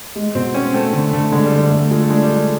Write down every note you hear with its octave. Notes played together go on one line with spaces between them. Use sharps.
G#3
B2 C4
C4 C#4
A3 C4
D3 A3
D3 A3
D3 G#3
G3
D3
G3
G3 A3
G#3 F4
A3
G#3 D4
G3
D4
G#3